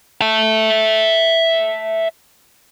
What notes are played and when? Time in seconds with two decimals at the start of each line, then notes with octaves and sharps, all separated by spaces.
0.21 E5 A5